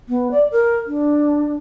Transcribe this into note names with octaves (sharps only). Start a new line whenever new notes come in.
B3
D5
A#4
D4